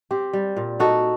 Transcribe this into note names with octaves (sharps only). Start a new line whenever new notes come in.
C4 G4
G3
A#2
D#4 F#4 A4